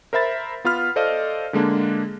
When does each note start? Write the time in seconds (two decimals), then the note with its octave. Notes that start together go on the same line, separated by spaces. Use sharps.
0.13 A#4 C5 E5 B5 A6
0.64 B3 F4 B5 F6
0.96 A4 C5 D5 D#5 F5
1.53 D3 G#3 A#3 D4